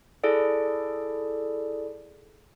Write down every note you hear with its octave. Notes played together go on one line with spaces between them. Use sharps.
E4 G#4 A4 D5